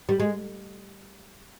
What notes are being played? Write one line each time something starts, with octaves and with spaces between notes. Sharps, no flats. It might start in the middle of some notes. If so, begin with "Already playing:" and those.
G3
G#3